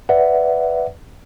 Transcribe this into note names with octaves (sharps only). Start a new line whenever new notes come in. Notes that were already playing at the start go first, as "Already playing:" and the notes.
B4 D5 E5 F#5